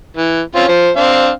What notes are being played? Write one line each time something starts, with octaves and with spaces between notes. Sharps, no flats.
E3
C4 C#4 F4
F3 C5
C4 D4 F5